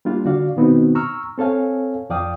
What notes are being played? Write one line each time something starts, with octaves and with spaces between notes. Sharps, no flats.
G3 A#3 D4 F4
D3 F#4 D5 F5
B2 D#3 B3 C4 D#4 F#4
A#5 C#6 E6 F6
C4 A4 C#5 F5 G#5
F2 F3 D5 F5 G5 D#6